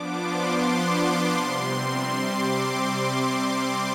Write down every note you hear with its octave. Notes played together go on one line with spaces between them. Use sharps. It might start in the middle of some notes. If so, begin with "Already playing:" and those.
Already playing: F3 B3 D4 D6
C6
C3 G3 C4
D6